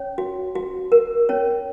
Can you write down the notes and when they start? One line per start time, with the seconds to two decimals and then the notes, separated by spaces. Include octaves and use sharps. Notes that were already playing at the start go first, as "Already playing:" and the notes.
Already playing: C#4 C#5
0.18 F#4
0.55 F#4
0.92 A#4
1.29 C#4 C#5